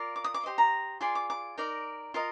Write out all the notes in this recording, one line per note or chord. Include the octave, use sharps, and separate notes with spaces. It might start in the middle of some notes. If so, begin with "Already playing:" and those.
Already playing: F4 A#4 D5
D6
D#6
D6
G4 C5 D#5
A#5
F4 G#4 D5 C6
D6
D6
D#4 A#4 D5
F4 A#4 D#5